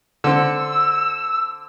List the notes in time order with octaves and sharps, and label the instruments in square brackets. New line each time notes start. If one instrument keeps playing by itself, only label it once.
[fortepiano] D3 C4 [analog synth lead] E6